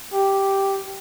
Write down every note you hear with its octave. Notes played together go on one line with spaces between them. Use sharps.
G4